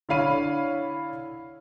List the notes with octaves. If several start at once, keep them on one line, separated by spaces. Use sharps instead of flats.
D3 E4 C#5 F5 B5 D#7